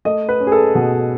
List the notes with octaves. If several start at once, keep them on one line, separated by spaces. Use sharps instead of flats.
A3 D#5
B4
C#4
G#4
A4
B2